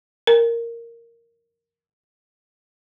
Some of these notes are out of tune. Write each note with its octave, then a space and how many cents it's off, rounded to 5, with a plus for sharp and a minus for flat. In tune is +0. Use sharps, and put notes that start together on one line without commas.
A#4 -5